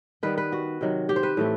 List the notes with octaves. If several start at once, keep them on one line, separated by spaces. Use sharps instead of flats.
D#3 G3 B3 B4
B4
F#4
C3 D#3 F#3
G4
C5
B4
A2 E3 A3 C4